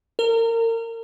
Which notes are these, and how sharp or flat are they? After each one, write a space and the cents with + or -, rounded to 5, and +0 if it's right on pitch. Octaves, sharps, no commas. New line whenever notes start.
A#4 -30